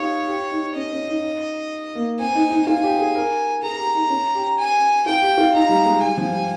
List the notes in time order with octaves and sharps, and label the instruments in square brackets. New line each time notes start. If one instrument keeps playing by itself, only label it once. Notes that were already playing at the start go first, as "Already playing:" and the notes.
Already playing: [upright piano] D#4 F4 G4 [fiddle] C#5
[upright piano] G4
D#4
[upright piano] C#4 [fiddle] D#5
[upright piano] C#4
D#4
A#3
[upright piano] C4 [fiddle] G#5
[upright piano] D#4
D#4
[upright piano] F4 [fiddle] G#5
[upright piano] G4
G#4
A#4
[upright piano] G#4 [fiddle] A#5
[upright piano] G4
D#4
C#4
G4
[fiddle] G#5
[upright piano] F4 [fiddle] G5
[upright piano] G4
F4
[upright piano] D#4 [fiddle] A#5
[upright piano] G3
G#3
[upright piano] G3 [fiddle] G#5
[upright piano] F3
G3